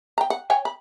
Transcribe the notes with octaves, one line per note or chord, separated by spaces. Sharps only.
G5 A#5
F#5
C#5 G5 G#5
B5